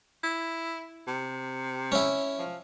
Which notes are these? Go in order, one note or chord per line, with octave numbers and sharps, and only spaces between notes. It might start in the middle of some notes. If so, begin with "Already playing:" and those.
E4
C3
C#4 E4
F3